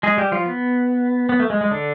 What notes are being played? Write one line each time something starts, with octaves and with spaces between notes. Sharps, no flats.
G#3 G#4
G3 G4
F3 F4
B3
B3
A3
G#3
G#3
D3 D4